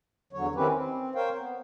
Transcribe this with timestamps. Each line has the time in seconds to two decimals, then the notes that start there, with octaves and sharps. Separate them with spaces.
0.33 E2 D3 F#3 C#5
0.55 D#3 C4 C#4 E4 G4 B4
0.73 C4
1.15 A#4 C5 C#5 F5 G5
1.38 B3